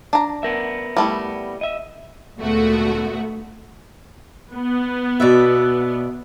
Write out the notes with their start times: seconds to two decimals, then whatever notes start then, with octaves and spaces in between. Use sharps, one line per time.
0.13 D4 A#5
0.43 B3 A#4 E5
0.97 G3 A3 E4
1.61 D#5 E5
2.38 D2 A#2 G#3 A3 B3 F#4
4.54 B3
5.20 B2 D5 E5